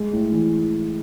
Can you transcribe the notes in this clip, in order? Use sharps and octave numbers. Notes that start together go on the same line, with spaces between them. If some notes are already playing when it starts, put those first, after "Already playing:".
Already playing: G#3
A2
E3